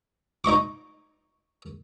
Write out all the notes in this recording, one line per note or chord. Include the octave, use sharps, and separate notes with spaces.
D#4 D#5 C#6 D6